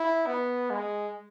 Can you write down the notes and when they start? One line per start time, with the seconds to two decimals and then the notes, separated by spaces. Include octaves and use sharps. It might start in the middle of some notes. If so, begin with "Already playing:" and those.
Already playing: E4
0.27 B3
0.70 G#3